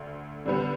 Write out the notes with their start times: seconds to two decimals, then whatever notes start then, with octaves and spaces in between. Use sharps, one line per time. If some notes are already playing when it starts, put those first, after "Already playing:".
Already playing: D2 D3
0.46 D3 G3 B3